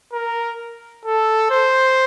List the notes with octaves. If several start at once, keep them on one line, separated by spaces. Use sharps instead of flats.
A#4
A4
C5